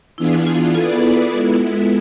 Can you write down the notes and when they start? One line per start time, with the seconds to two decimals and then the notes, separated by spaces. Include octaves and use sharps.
0.18 E3 B3 D4 E4 F4 G#4
0.47 F4
0.74 B3 E4 F4 G#4 A4 B4 D5
1.31 G#3 B3 E4